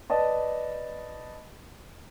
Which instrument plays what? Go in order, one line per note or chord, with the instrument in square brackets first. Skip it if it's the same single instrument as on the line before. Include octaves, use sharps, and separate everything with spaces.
[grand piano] B4 D5 D#5 A5